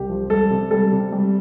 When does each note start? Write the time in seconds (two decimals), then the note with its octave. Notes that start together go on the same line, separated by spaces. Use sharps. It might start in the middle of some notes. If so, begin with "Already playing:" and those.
Already playing: C2 G4
0.09 F3
0.30 G3 A4
0.50 C3
0.71 G3 A4
0.91 C3
1.12 G3